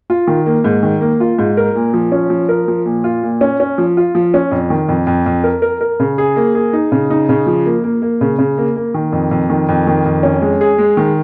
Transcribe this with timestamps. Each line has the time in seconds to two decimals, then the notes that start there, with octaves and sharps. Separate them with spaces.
0.10 F4
0.27 D#3
0.46 A#3
0.64 G#2
0.83 D#3
1.01 A#3
1.20 F4
1.38 G#2
1.57 A#4
1.75 A#2
1.94 F3
2.12 C#4
2.30 F3
2.49 A#4
2.68 F3
2.85 A#2
3.04 F4
3.23 A#2
3.41 C#4
3.60 C#4
3.78 F3
3.97 F4
4.15 F3
4.34 C#4
4.51 F2
4.70 D#3
4.89 F2
5.07 F2
5.26 F2
5.44 A#4
5.62 A#4
5.81 A#4
6.00 C#3
6.18 G#4
6.36 A#3
6.55 G#4
6.73 D#4
6.92 C#3
7.10 D#4
7.29 C#3
7.46 F3
7.66 A#3
7.84 A#3
8.02 A#3
8.21 C#3
8.39 C#3
8.58 A#3
8.76 A#3
8.94 D#3
9.12 F2
9.31 F2
9.50 D#3
9.69 F2
9.87 D#3
10.06 F2
10.23 C#4
10.41 G#3
10.61 G#4
10.78 G#3
10.97 D#3